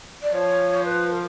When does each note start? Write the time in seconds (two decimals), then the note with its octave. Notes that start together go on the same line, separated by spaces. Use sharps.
0.22 D5
0.33 F3 C#5
0.84 B4
1.10 A#4